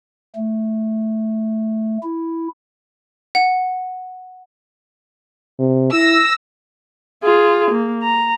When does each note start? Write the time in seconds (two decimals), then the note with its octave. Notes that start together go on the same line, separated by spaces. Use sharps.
0.35 A3
2.03 E4
3.35 F#5
5.59 C3
5.92 E4 E6 A#6
7.23 F4 G#4
7.71 A#3
8.02 A#5